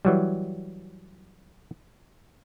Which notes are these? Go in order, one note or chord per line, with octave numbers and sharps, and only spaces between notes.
E3 F#3 G3